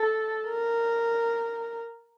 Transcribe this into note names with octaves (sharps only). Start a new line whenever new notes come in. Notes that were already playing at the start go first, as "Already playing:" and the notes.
Already playing: A4
A#4